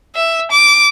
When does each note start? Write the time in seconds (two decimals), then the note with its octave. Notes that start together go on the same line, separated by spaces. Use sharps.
0.15 E5
0.51 D6